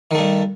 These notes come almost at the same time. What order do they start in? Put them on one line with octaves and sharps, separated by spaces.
D#3 A3 G2